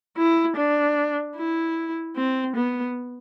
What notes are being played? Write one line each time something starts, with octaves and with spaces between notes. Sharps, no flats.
E4
D4
E4
C4
B3